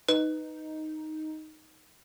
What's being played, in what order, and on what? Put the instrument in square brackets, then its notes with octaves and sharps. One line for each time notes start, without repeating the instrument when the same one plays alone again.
[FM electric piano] D#4 [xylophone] B4